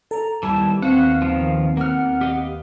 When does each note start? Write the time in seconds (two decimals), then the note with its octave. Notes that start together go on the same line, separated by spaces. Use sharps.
0.11 A4 A#5
0.43 D#2 E3 G3 B3 E4 A5
0.82 C4 F#4 F5 F#5
1.22 D#3 F3
1.77 A#3 F#5 F6
2.21 G4 D#5 F5